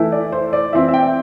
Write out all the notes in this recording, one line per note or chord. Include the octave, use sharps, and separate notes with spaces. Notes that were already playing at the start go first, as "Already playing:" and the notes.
Already playing: E3 A3 E4
D5
C5
D5
E3 C4 E4 E5
E5
G5